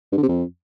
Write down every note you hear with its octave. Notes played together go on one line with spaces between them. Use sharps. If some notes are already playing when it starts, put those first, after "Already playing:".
G2
D3
C3
F2